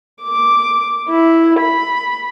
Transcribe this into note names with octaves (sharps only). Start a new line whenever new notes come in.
D6
E4
B5